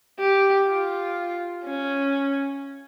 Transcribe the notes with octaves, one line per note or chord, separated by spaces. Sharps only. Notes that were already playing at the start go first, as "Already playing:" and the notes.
G4
F4
C#4